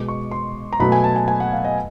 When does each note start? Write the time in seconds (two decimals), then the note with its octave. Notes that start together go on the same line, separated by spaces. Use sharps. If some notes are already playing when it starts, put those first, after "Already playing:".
Already playing: B2 G#3 D6
0.08 C#6
0.31 C6
0.73 A#5
0.80 B2 F#3 A3 B5
0.92 G#5
1.04 A5
1.16 G#5
1.28 G#5
1.40 F#5
1.52 F5
1.65 D#5